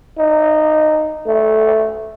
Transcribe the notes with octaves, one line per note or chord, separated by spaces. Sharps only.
D#4
A3